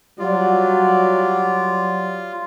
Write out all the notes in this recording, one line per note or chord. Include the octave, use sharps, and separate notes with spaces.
F#3 G3 F4 D5